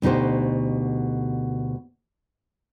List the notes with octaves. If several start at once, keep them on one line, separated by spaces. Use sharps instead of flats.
D2 B2 D#4 G4 C5